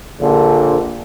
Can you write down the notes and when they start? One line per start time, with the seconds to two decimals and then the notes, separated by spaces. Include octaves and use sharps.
0.20 A#1 D3